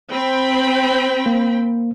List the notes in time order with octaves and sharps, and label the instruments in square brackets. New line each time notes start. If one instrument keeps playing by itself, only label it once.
[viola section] C4 G5 B5
[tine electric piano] A#3